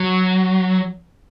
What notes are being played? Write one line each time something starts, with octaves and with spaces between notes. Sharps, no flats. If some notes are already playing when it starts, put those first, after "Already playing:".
Already playing: F#3